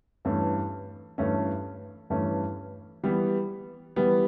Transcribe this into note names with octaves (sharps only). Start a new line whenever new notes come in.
G2 E3 A3 C#4
G2 E3 A3 C#4
G2 E3 A3 C#4
E3 G3 B3
E3 G3 B3